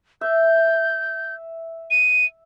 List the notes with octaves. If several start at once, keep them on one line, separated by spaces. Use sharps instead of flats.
E5 G6
D#7